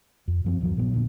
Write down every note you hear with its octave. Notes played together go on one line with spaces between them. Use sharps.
F2
F#2 F3 C4
D#1 G2 F3 F#3
A#1 A#2 F#3 B3
A#2 D3